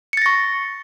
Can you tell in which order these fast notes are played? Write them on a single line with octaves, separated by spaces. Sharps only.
C#7 A6 A#6 C#6